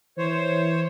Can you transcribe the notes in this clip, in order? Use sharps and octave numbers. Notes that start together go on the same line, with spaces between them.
E3 C5 C#5